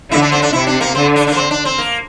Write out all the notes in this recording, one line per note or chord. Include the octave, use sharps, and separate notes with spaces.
D3 E4
D4
C4
D4
C3 E4
D4
A#3
D3 C4
D4
D4
A#3
C4
D4
C4
A#3